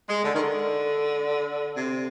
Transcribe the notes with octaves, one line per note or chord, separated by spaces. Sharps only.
G#3
D3
D#3
D3
C3